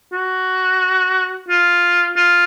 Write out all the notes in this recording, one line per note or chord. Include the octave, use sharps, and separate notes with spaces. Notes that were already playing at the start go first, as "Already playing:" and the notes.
F#4
F4
F4